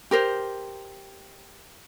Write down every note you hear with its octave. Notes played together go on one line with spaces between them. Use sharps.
G4 A#4 C5